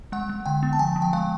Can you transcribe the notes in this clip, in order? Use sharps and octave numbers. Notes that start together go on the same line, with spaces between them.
G#3 F#5
G#3
D3 G5
B3
A5
F3 G#5
F3
G5
G#3 F5